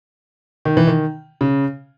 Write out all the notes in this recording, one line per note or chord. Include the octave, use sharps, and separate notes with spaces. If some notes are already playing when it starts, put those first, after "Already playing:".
D#3
E3
D#3
C#3